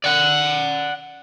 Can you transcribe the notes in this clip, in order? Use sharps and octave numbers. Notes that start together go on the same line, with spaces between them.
D5 F#5